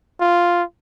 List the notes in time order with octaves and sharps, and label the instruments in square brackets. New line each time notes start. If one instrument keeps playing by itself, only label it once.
[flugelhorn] F4